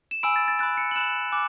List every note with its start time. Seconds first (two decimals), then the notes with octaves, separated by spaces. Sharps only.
0.11 E7
0.23 G#5 B5 E6 D7
0.36 A6
0.48 A6
0.59 B5 F#6 A6
0.77 C#7
0.91 F#7
0.96 B5 F#6 E7
1.32 G#5 D6 F#6